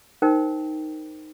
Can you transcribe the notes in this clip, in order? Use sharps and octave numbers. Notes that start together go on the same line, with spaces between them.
D#4 A#4 C5 G5